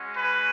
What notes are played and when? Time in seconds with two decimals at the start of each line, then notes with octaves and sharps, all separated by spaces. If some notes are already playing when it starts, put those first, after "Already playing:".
Already playing: G#3 C#4 F#4
0.13 B4